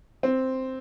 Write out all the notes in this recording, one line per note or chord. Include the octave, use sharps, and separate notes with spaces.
C4